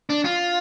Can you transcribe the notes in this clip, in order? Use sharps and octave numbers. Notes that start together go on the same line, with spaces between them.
D4
F4